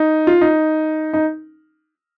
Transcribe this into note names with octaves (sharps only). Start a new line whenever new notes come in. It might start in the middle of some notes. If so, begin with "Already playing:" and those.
Already playing: D#4
F4
D#4
D#4